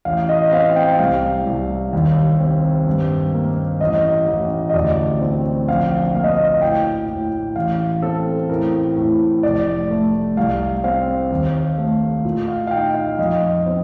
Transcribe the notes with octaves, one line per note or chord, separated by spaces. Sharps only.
A1 F5
D#5
C4 F5
G5
C2 F5
C2
D#2
C4
G2
A#3
A1 D#5
A1
D#5
D2 D5
C4
A#1 F5
A#3 F5
D#5
F5
A2 G5
A2
A1 F5
C4 A4
A2 A#4
A2
F1 D5
A3
C2 F5
C4 F5
D#2
A3
A#2
F5
F5
D#4 G5
F5
F2 D#5
C4